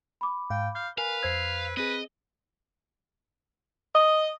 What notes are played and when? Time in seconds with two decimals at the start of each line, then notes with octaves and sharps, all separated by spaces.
0.21 B5 D6
0.50 G#2 F5 G5
0.75 F5 G6
0.98 A#4 B4 F5 G#5
1.23 F2 C5 E6 G#6 C7
1.77 C4 G#4 B4 D#5
3.94 D#5